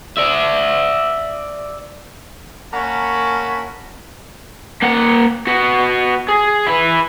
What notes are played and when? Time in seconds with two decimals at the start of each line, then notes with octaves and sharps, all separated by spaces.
0.17 D5 E5
2.73 A#3 C#4 A#4 F#5 A5 B5
4.82 A#3 F#5
5.47 B3 F#4
6.28 G#4
6.67 E4 B4